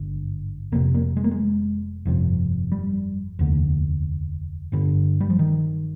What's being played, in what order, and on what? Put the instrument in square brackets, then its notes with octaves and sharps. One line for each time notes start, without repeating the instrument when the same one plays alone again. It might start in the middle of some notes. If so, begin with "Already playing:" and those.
Already playing: [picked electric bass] G#1 G2 D3
F1 F2 C3 A#3
A#3
G#3
A#3
G#3
G1 F2 C3
G3
F1 D#2 D3
G1 G2 D3
G3
F3
D#3